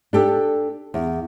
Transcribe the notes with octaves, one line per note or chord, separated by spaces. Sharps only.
D4 G4 A4
E2